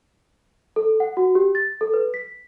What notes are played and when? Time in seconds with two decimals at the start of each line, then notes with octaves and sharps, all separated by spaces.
0.76 A4
1.00 F#5
1.17 F#4
1.35 G4
1.55 A6
1.81 A4
1.94 B4
2.14 B6